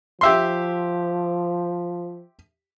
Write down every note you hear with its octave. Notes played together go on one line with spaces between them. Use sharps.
F3 G4 E5 C6